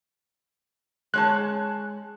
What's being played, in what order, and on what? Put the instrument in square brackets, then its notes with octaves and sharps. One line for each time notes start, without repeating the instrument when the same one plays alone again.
[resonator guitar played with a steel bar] G#3 C#5 A5 [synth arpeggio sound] F#6